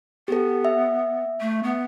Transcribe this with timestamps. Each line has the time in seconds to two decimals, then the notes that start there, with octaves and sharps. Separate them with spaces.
0.28 B3 G4 A4
0.65 E5
1.40 A3
1.63 B3